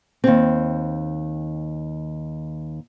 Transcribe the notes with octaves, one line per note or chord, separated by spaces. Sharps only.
D#2 C4